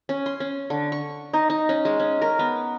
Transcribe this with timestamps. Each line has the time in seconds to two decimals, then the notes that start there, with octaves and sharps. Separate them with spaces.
0.09 C#4
0.26 C6
0.40 C#4
0.70 D3
0.92 C#6
1.33 D#4
1.50 D#4
1.69 C#4
1.85 G#3
2.00 C#4
2.22 A#4
2.39 B3